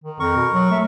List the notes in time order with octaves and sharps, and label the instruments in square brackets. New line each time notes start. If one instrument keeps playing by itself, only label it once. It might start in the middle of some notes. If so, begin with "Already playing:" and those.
[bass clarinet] D#3
[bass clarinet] F2 [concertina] A#4 C#6
[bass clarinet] B2
F#3
A3